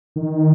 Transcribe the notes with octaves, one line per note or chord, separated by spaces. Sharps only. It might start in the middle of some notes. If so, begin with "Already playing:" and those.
D#3